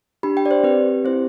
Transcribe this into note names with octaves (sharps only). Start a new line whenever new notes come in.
D4 G4 B5
G5
D5
C5
C4 G4 B4
C4 E4 G4 C5